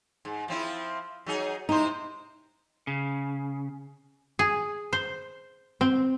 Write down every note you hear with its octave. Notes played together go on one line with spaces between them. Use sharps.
G#2
F3 C4 E4
F#3 D#4 G#4
C3 D#4 E4 C5
C#3
G#4
C5
C4